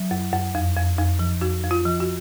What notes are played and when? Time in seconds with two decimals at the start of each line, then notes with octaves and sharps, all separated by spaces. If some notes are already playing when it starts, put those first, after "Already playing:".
Already playing: F#3
0.11 F#2
0.33 F#2
0.55 F2
0.77 F2
0.98 F2
1.19 F3
1.41 F2 F#4
1.64 F2
1.71 F4
1.86 F3
2.00 F#4